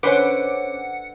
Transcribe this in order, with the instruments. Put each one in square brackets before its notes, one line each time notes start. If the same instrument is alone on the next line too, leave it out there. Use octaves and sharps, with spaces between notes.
[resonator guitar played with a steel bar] D3 B4 C5 [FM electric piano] C#4 D6 [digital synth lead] F#5